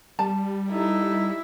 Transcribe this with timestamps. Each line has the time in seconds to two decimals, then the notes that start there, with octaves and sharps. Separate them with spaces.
0.19 G3 A5
0.71 D#4 E4 A4